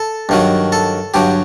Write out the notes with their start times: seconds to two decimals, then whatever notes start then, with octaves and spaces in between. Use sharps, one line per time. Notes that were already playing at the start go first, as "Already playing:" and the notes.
Already playing: A4
0.29 G2 D#3 F#3
0.72 A4
1.14 G2 D3 F#3 G4